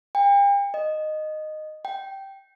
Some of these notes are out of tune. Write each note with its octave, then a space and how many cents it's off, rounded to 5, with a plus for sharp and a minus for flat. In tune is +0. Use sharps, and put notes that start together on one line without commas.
G5 +40
D#5 -10
G5 -10